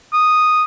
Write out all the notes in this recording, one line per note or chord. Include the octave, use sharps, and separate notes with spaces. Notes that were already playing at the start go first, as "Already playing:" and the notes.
D#6